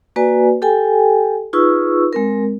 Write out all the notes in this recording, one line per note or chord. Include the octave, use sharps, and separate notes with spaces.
A#3 F#4 B4 D5 G#5
G4 A4 G5 G#5
D#4 F4 G#4 B4 C#6 E6
G#3 C4 A#4